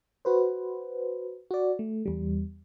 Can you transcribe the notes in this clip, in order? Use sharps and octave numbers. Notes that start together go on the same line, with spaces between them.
F#4 B4 C5
F#4 D5
A3
E2 G3